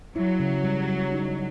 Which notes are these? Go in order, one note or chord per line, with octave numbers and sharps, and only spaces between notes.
F#3 E4
C#3
G3
G3
D#4